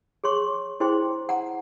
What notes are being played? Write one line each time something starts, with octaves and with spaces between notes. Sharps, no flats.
G#4 C#5 C6 C#6
E4 G#4 C5 G5 C6
F#5 A#5